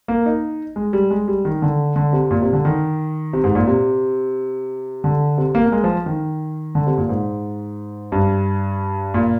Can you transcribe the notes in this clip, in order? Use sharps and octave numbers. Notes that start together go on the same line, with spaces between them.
A#3
D#4
G#3
G3
G#3
G3
D#3
D3
D3
C3
A#2
C3
D3
D#3
C3
G#2
A#2
C3
D3
C3
A#3
A#3
G#3
F3
D#3
D3
C3
A#2
G#2
G2
A#2